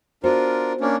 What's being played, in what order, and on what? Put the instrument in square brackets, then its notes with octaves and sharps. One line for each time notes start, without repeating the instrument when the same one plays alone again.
[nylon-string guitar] B3 F#4 C5 [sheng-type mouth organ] D4 F4 A#4
[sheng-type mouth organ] A#3 C#4 D4